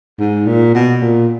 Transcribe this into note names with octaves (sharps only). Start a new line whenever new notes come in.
G#2
A#2
B2
A#2